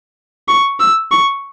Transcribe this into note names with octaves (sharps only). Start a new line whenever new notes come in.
C#6
E6
C#6